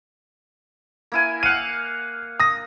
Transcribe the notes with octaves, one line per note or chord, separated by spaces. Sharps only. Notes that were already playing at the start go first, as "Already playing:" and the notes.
A#3 E4 G#5
F5 F#5 D#7
D#6 A#6